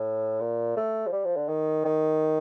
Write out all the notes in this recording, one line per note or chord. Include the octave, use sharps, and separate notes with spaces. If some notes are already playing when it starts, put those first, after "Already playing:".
Already playing: A2
A#2
A3
F3
G3
F3
D3
D#3
D#3